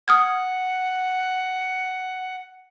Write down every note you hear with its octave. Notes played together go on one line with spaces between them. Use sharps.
F#5 D#6 F6 G#6